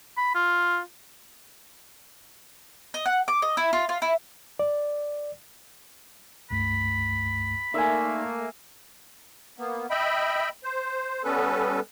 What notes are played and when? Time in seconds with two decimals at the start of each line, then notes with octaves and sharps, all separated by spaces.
0.17 B5
0.35 F4
2.94 D#5
3.06 F#5
3.28 D6
3.42 D#5
3.57 E4
3.73 F4
3.89 F4
4.02 E4
4.59 D5
6.50 C#2 G2 A3 B5
7.74 A3 A#3 D#4 D5 E5 G#5 C6
9.58 A#3 B3
9.90 D#5 E5 G5 B5
10.64 C5
11.24 G3 B3 C#4 A4 B4